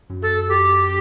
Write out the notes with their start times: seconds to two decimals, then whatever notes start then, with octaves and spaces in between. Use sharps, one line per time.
0.10 F#2
0.22 A4
0.48 G4